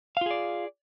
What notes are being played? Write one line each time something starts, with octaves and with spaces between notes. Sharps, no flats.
F4 G#4 D5 F5